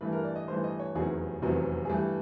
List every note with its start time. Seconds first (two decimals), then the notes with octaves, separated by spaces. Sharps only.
0.01 G2 E3 A3 B4
0.12 A#4
0.24 D5
0.36 D#5
0.47 G2 E3 A3 C5
0.64 D#5
0.80 C#5
0.95 F1 E2 C3 D#3 F#3 G#4
1.42 F1 E2 C3 D#3 F#3
1.85 G#4
1.89 G2 E3 A3 G4